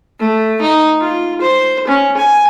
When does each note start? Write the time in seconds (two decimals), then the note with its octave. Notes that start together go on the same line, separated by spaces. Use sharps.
0.20 A3
0.61 D#4
1.00 F4
1.41 C5
1.88 C#4
2.17 G#5